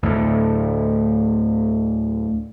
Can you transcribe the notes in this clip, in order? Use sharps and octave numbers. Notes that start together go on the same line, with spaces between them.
D2 A2 D3